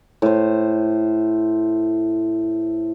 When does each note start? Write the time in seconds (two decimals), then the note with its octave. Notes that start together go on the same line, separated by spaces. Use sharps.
0.22 A2 C5